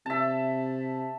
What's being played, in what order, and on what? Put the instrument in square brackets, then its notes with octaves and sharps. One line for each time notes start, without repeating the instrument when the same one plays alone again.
[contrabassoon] C3 [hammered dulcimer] E5 A5